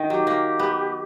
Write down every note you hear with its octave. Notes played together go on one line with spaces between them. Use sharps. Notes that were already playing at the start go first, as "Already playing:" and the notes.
Already playing: D#3
F#3 G4
A#3
B3